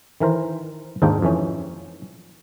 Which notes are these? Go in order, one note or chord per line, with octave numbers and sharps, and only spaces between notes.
D#3 E3 A#4 C5
D#2 G#2 D4 D#4 F4 G5
F2 E3 C#4